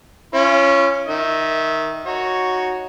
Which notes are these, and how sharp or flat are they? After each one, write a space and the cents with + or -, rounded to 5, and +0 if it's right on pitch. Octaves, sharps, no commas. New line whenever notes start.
C#4 +0 F4 -40
D#3 +0 E5 -15
D#4 +0 F#4 -5 C#5 +0